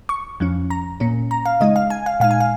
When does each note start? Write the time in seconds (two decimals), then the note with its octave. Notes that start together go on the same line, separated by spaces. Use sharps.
0.09 C#6
0.40 F2 F3 C#4
0.70 A#5
1.00 A#2 A#3 C#4
1.31 A#5
1.46 F5
1.60 C#3 G#3 D#4 D#5
1.76 F5
1.90 G#5
2.06 F5
2.20 A#2 G#3 D#4 F5
2.31 G#5
2.40 F5